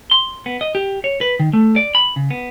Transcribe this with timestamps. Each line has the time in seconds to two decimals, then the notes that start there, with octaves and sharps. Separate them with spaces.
0.11 C6
0.46 B3
0.61 D#5
0.75 G4
1.04 C#5
1.21 B4
1.40 D#3
1.53 A3
1.76 D5
1.95 B5
2.16 C#3
2.31 B3